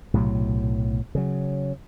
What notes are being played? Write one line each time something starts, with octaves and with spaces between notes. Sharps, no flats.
B1 A2 C3 F#3
C#3 F#3